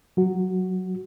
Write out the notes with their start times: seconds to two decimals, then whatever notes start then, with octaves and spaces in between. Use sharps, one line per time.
0.17 F#3 F#4